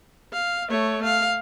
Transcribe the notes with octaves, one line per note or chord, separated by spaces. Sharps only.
F5
A3 C#5
F5